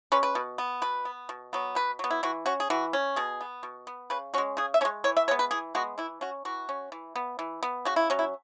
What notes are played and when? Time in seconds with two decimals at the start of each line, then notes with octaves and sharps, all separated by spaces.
0.12 G#3 C#4 B4
0.23 B4
0.35 B2
0.58 B3
0.82 B2 B4
1.05 B3
1.29 B2
1.53 F#3 B3
1.75 B2 B4
1.99 F#3 B3
2.10 E4
2.23 E3 F#4
2.46 C#4 F#4
2.60 G#4
2.70 E3 F#4
2.93 C#4
3.16 B2 G#4
3.41 B3
3.63 B2
3.87 B3
4.10 C#3 B4
4.34 G#3 C#4 F#4
4.57 C#3 G#4
4.74 E5
4.81 C#4 C#5
4.85 G#3
5.04 E3 C#5
5.17 E5
5.28 G#3 B3 C#5
5.39 B4
5.51 E3 G#4
5.75 G#3 B3 F#4
5.98 E3 E4
6.21 C#4 F#4
6.45 E3 F#4
6.69 C#4
6.92 E3
7.16 B3
7.39 E3
7.63 B3
7.85 C#3 F#4
7.96 E4
8.10 F#3 C#4
8.19 E4